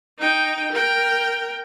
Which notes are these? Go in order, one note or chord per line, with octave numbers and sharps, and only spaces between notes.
D#4 G5
A#4 G5